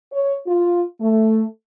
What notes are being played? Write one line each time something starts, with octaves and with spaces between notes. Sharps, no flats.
C#5
F4
A3